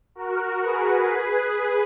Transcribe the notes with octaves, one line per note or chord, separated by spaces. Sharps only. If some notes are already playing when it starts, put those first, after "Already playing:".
F#4 A#4
G#4 B4
G#4 B4